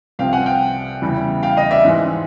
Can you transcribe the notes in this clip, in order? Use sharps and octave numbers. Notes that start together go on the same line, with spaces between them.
C2 C3 F3 F5 G5
F#5 G#5
F5 G5
E2 C#3 E3 G3
F5 G5
D#5 F5
D5 E5
G#2 E3 G#3